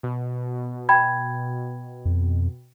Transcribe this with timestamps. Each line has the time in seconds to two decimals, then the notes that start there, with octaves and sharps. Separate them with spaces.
0.03 B2
0.89 G5 B5 G#6
2.05 F2